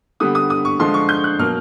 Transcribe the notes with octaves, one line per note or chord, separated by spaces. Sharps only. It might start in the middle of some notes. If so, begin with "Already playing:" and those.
D3 G3 B3 D#6
D#6
D#6
C#6
D3 F3 G#3 C6
C#6
G6
F#6
B2 F#3 A#3 F6